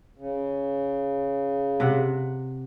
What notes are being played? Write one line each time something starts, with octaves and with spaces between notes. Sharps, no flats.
C#3
C3 F#5